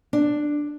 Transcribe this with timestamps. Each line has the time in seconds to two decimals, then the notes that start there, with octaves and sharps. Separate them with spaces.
0.13 D4